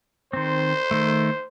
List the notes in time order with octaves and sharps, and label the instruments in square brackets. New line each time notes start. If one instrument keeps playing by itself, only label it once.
[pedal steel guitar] D#3 C4 [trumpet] C5
[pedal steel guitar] D#3 A3